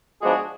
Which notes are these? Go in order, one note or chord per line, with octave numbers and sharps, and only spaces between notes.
G#2 F3 G#3 B3 D4 F#4 G#4